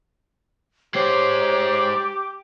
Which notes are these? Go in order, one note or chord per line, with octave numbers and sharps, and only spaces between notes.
G#3 G4 C5 C#5 D6